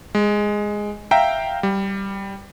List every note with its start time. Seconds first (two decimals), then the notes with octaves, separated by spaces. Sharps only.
0.15 G#3
1.11 E5 F5 G5 A#5
1.63 G3